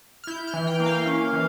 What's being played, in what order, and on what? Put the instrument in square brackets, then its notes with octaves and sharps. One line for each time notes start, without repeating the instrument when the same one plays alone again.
[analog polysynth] F6
E4 G6
F6
E3
G5
A#3
F5
C#4
E3